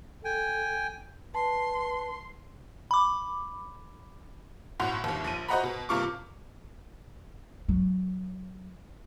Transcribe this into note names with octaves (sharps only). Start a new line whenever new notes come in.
A4 G5 G#5
B4 A5 C6
B5 D6
B1 A2 F#4 C6 F7
G1 D#2
A#1 D#7
F#4 C5 D#5 F#5 A#5 B5
B2
G2 C3 A#3 F4 C#6 D6
F#3